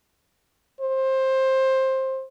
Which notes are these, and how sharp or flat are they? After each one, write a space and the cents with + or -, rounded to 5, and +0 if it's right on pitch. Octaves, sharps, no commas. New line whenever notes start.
C5 +15